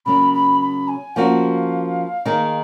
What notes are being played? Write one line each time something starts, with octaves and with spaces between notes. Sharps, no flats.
C#3 F#3 A#3 C#4 B5
B5
B5
G#5
F3 A#3 C#4 F#4 F5
D#3 A#3 D#4 G#4